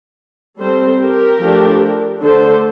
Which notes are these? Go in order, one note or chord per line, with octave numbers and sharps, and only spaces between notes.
G3 C4 A4 C5
G4 A#4
F3 A3 D4
D3 A3 D4 A4 C5